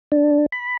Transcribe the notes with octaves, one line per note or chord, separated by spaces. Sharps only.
D4
B5